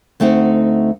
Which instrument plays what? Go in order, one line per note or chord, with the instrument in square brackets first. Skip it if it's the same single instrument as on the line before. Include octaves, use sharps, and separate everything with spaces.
[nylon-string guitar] D2 A3 C4 D#4 F#5